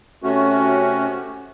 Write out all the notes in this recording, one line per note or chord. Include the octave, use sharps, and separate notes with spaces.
C3 A3 C#4 F#4